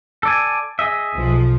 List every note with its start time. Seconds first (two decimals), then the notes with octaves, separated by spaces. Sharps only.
0.23 A4 D5 G#5
0.79 G#4 D#5 E5
1.14 B1 F3